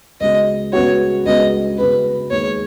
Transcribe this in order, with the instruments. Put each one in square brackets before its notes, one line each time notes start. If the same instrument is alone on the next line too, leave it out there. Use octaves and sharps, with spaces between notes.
[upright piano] C#2 C#3 B3 F#4 [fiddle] D#5
[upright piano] C#2 C#3 B3 F#4 [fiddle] C#5
[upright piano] C#2 C#3 B3 F#4 [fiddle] D#5
[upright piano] C#2 C#3 B3 F#4 [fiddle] B4
[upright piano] D#2 D#3 G#3 [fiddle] C#5